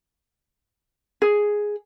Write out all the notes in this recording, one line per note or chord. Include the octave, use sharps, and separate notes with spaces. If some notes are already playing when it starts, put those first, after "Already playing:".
G#4